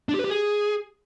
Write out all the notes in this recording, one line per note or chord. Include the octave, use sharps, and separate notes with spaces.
D4
G4
B4
G4
G#4